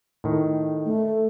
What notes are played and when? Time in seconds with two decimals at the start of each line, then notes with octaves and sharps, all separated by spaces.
0.24 A2 D#3
0.85 A3